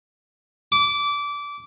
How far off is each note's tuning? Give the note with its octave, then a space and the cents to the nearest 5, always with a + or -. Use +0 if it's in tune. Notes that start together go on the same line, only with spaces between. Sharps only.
D6 -20